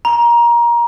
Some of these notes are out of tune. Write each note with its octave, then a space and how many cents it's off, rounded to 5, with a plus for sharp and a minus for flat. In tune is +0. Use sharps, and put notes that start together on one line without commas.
A#5 +20